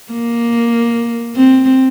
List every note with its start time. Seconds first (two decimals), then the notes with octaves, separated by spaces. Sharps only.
0.12 A#3
1.36 C4